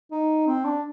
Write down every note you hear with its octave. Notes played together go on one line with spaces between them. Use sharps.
D#4
C4
D4